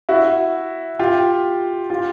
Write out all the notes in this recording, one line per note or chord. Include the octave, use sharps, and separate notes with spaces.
E4 F#4
F4 G4
F4 G4